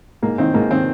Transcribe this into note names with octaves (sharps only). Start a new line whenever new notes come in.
G#2 A#3
D#3 C4
G#2 A#3
D#3 C4